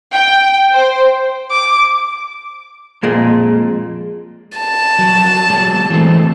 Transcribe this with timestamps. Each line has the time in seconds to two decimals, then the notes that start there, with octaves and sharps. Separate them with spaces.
0.13 G5
0.73 C5
1.51 D6
3.03 F2 A#2 G#3
4.58 A5
4.99 F#3
5.50 F#3 G#3
5.90 E3 A3 C4